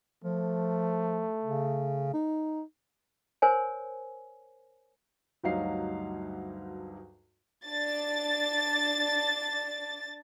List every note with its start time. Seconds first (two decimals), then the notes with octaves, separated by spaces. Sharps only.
0.24 F3 A3
1.45 C#3
2.14 D#4
3.42 A#4 C5 C#5 G#5
5.44 D2 G2 F#3 D#4 F5 C7
7.66 D4 A6